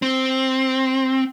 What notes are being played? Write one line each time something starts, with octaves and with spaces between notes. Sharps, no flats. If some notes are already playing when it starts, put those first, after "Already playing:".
C4